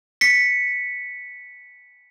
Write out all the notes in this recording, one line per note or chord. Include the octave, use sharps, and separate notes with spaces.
B6 C#7